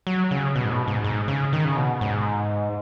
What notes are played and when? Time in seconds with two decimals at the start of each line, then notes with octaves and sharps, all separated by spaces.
0.07 F#3
0.31 C#3
0.56 B2
0.65 G#2
0.71 B2
0.88 G#2
1.04 G#2
1.28 C#3
1.53 D#3
1.65 C#3
1.77 B2
2.01 G#2